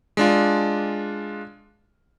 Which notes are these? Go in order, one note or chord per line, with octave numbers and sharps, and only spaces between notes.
G#3 D4 F4